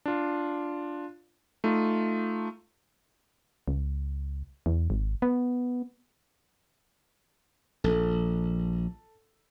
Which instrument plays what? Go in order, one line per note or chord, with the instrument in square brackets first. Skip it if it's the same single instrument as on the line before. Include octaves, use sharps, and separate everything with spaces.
[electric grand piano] D4 F4
A3 D#4 F4
[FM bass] C#2
E2
G#1
B3
[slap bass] A#1 [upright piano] A4